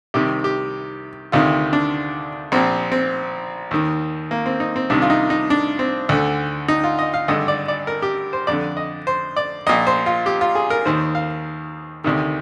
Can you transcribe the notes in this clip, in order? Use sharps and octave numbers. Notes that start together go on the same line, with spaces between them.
C2 C3 D#3 G4
G4
D2 C3 D#3 F4
D4
A#1 A#2 C4
C4
D#2 D#3
A#3
C4
D#4
C4
C2 C3 D#3 D4
F4
D#4
D#4
D4
C4
D2 D3
D#4
F4
D#5
F5
G#1 G2 D3 D#5
D5
D5
A#4
G4
C5
F2 D3 D5
D#5
C5
D5
A#1 A#2 D#5
C5
F4
G4
F4
G#4
A#4
D#2 D#3 C5
F5
D2 C3 D#3